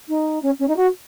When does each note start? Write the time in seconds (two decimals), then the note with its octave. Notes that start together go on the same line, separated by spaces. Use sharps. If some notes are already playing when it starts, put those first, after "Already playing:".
0.08 D#4
0.42 C#4
0.59 C#4
0.67 D#4
0.76 F#4